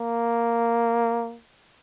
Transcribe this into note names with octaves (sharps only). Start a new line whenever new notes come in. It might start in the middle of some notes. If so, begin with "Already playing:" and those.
Already playing: A#3